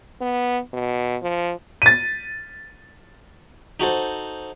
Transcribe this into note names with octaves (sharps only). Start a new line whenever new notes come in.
B3
B2
F3
A6 D#7
D#4 F#4 A4 C5